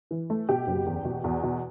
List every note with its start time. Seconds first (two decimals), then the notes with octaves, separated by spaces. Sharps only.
0.11 E3
0.30 A3
0.49 B2 G4
0.67 F#1
0.86 E2
1.05 B2
1.24 E2
1.43 B2